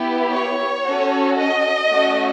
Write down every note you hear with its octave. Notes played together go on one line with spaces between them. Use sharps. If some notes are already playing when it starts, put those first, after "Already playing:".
Already playing: B3 E4 G4
C#5
C#4 F#4 A4
D#5
A3 C#4 F#4